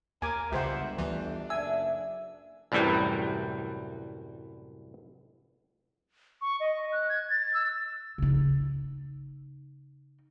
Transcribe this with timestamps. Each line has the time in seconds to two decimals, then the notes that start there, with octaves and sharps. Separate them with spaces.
0.22 D#2 A#4 G#5 D6
0.52 G1 C#2 C#3 G4 C5 E5 F#5
0.98 D2 E3 D4
1.50 F#1 D5 E5 G#5 E6
2.72 C2 F#2 A2 E3 G3
6.42 C#6
6.60 D#5
6.92 F#6
7.09 G#6
7.30 A6
7.54 E6
8.18 C#3 D#4